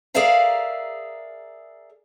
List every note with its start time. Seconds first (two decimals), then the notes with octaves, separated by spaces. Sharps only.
0.14 G#4 A#4 D5 E5 F5 A#5